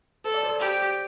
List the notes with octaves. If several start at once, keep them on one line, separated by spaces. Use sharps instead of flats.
A4 C5
D5
C5
G4